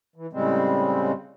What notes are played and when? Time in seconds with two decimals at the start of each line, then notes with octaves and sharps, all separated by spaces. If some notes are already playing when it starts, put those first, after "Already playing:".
0.16 E3
0.33 A2 C#3 G3 G#3 C4